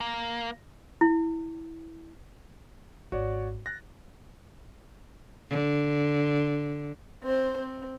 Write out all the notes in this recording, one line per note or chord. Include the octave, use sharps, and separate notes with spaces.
A#3
E4
G#1 F#4 C#5 D5
F#6 A6 A#6
D3
C4 C5
C4